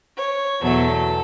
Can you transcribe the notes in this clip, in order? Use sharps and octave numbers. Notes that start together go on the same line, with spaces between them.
C#5
E2 B2 F#3 A3 A4